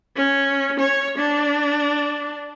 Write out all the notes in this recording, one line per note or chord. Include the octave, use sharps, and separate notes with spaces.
C#4
C#5
D4